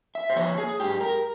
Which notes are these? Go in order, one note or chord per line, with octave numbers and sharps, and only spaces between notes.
E5
C5
F3 A#3 C#5
G#4
G#2 G4
A#4